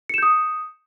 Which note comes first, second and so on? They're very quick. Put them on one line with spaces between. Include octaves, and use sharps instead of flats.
C#7 E7 G6 D#6